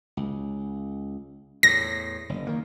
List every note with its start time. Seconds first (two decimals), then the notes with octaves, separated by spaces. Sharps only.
0.17 C#2
1.63 E2 A2 A#6
2.29 F#1
2.47 D#3 A#3